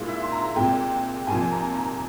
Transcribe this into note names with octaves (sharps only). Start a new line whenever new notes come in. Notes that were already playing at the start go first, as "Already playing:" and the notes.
Already playing: A#2 G#3 E4 F5
E5
C6
A#5
C2 A#2 G#3 G5
C2 A#2 F3 G#5
A#5
A#5